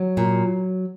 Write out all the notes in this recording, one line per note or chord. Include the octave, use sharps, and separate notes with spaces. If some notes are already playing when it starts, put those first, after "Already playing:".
Already playing: F#3
A#2